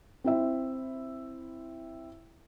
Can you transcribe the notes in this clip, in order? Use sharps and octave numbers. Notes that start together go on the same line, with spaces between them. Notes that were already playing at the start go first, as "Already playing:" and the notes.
C4 E4 E5